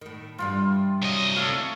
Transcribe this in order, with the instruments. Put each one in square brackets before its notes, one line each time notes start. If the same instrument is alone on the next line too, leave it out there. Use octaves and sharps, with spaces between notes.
[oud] A2 D#3
[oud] G2 E3 G3 [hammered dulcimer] F4
[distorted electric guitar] C2 D#5 [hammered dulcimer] F#3
[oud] A3 E4 F4 [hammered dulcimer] A4 C#5 F5